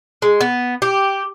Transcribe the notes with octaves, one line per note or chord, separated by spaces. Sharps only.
G#3
B3
G4